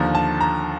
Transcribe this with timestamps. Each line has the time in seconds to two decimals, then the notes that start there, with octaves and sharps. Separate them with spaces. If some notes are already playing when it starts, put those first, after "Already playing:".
Already playing: D#2 D3 F3 A#5
0.15 A5
0.41 A#5